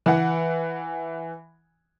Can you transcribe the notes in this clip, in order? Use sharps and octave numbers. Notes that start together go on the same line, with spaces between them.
E3 F#5